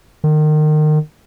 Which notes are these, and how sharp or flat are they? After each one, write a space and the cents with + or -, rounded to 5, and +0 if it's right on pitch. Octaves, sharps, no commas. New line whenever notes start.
D#3 -30